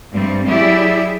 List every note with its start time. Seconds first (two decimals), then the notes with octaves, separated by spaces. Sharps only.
0.13 G2 G3 A3 C4
0.46 F#3 E4 G4 G#4 D5 E5